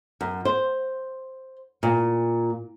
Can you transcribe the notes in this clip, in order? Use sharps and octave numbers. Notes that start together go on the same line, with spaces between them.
F#2
C5
A#2